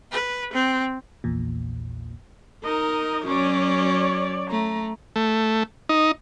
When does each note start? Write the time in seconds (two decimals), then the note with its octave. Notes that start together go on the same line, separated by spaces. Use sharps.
0.11 B4
0.53 C4
1.24 A#1 E2 A#2
2.64 D#4 A#4 D#5
3.25 F#2 F#3 C#4 C#5 D5
4.50 A3 A#5
5.16 A3
5.89 D#4